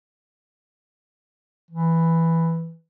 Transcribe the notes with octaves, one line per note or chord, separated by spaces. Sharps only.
E3